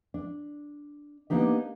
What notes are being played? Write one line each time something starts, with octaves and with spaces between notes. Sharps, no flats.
D4
A#3 B3 D4 D#4 G4